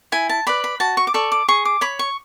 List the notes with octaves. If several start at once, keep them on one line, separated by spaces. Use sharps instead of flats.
E4 G#5
A5
B4 D5 B5
B5
F#4 A5
C#6
D6
A4 D5 C#6
D6
G#4 C#6
D6
C#5 B5
C#6